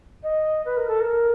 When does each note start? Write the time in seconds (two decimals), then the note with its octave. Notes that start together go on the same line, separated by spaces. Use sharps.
0.23 D#5
0.65 B4
0.77 A#4
0.88 A4
1.00 A#4